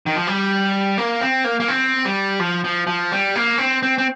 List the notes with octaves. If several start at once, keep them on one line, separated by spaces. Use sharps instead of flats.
D#3
F3
G3
A#3
C4
A#3
A#3
C4
G3
F3
F3
F3
G3
A#3
C4
C4
C4